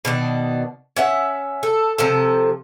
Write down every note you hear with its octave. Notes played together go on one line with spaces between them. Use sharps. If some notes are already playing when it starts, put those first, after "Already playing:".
B2 D#3 D4
C#4 E5 F#5
A4
C3 F3 A4